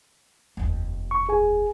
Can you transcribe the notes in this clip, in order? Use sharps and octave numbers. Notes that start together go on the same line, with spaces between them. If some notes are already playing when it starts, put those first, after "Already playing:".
F1 D#2
C#6
G#4 G#5